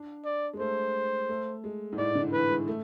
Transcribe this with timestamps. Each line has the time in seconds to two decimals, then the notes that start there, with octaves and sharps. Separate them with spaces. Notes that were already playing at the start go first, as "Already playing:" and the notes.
Already playing: D4
0.25 D5
0.53 G#3
0.60 A3 C5
1.29 A3
1.64 G#3
1.92 G#2
1.98 A2 D5
2.15 D3
2.33 E3 B4
2.50 G#3
2.68 A3